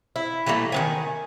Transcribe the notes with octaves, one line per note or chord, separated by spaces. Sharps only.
E4
E3 G3 A3 A#3
D#3 B3 G#5